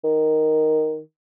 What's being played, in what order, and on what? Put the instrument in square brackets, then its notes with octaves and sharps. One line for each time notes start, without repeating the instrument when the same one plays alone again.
[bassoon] D#3